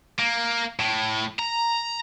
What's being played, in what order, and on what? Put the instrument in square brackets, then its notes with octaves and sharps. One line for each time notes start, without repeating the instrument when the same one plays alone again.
[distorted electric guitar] A#3
A2
A#5